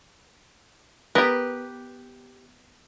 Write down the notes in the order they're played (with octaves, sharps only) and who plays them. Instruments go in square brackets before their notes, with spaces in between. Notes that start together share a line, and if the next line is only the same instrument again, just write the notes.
[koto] B3 A#4 [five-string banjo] G4 B4